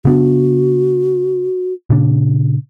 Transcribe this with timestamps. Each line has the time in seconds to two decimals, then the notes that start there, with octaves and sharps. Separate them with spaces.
0.05 C#3 B3 D4 F#4
1.90 A#2 C#3 D4